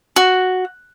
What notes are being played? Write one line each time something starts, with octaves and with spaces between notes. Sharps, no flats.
F#4